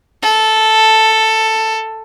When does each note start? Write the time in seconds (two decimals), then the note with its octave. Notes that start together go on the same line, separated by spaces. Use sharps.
0.22 A4